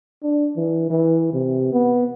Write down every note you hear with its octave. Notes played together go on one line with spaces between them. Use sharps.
D4
E3
E3
C3
B3